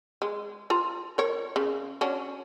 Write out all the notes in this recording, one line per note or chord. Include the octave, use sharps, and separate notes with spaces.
G#3
F4 A#5
A#4 C#5
C#3
C#4 D4 F#4